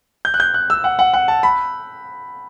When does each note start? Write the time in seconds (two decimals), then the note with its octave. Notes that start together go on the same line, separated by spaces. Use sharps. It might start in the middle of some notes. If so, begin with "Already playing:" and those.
0.25 G6
0.34 F#6
0.40 G6
0.54 F#6
0.70 E6
0.84 F#5
0.99 F#5
1.13 F#5
1.28 A5
1.43 B5